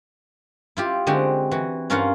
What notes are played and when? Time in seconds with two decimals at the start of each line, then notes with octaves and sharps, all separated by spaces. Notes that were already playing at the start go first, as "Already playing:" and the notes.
0.77 E4 F4 G4
1.07 D3 G#3 C4 F#4 G4
1.51 E3 F#4
1.90 G2 C#4 F4 A#4 F5 F#5